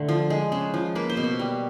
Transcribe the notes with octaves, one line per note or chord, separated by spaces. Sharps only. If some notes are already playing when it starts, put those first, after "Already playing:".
Already playing: D3 A3
F3
G#3
C#3
F3
A#3 B4
C5
B2
B4
G3